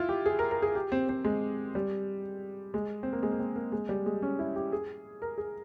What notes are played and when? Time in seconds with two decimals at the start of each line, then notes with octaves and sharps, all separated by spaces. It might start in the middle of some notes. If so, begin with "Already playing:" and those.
Already playing: E4 F4
0.09 G4
0.26 G#4
0.39 A#4
0.51 A#4
0.62 G#4
0.75 G4
0.92 C4
1.09 C4
1.24 G#3
1.75 G3
2.74 G#3
3.03 C4
3.13 A#3
3.23 G#3
3.32 A#3
3.39 C4
3.56 A#3
3.72 G#3
3.89 G3
4.06 G#3
4.22 C#4
4.39 E4
4.56 G4
4.73 G#4
5.22 A#4
5.38 G#4